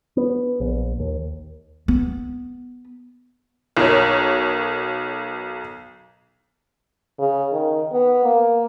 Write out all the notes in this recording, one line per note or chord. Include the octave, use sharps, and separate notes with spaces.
B3
A#1
D#2
B3
B1 A#4 C#5
C#3
D#3
B3
A#3